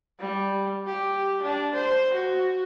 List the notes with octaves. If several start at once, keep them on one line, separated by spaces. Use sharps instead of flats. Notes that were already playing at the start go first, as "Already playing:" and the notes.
G3
G4
D4
C5
F#4